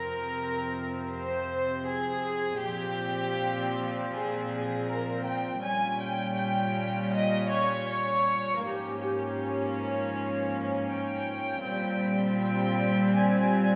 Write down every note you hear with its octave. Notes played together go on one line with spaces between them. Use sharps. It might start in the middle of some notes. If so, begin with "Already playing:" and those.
Already playing: F2 C3 F3 C4 A#4
C5
G#4
A#2 F3 C4 G4
G#4
G#4
A#4
G5
A#2 G3 C#4 G#5
G5
G5
D#5
C#5
C#5
G#2 F3 A#3 C#4 G4
G4
G5
A#2 G3 C4
G5
G#5